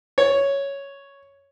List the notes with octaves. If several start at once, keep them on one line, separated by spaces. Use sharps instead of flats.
C#5